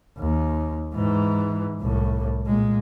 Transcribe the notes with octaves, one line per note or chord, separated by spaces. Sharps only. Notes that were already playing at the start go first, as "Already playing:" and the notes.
D#2
G#2 E3
C2 A2
A#2 G#3